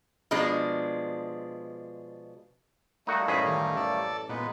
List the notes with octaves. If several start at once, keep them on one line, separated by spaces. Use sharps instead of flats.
B2 F3 G#3 D4
G3 A3 A#3 D#4 F#4
A1 F#2 D#4 G#4 B5
D#3
A4 D5
A#2 G#3 B3 D#4